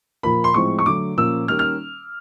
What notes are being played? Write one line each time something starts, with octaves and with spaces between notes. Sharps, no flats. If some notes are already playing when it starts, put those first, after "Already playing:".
A#2 F3 A#3 B5
C6
A2 F3 G#3 C4 C#6
C#6
D3 F#3 A3 D6
A#2 F3 A#3 C#4 E6
D#3 G3 A#3 C#4 F6
F6